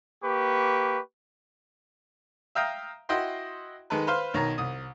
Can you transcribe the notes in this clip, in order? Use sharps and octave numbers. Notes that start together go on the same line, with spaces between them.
A#3 G4 B4 C#6
E5 F5 G5 A#5 D#6
E4 F#4 D#5 G5 C6
D#3 G#3 A4 B4
B4 C5 F5 C6
B1 D#3 C#5 A#5
C2 D#6